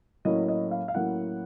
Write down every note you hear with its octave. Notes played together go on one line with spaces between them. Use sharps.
A2 F#3 A#3 C#4 E4 D#5
D#5
F5
F5
A2 F#3 A#3 C#4 E4 F#5